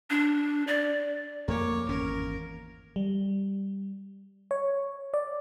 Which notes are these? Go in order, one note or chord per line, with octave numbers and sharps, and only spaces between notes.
D4
D5
F2 A3 A#3 C#5 D6
G#1 E2 C#4 A#4
G3
C#5
D5